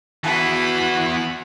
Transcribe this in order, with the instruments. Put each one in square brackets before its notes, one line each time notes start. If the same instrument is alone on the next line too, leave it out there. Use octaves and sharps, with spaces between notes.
[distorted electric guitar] E3 B3 [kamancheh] F#4 B5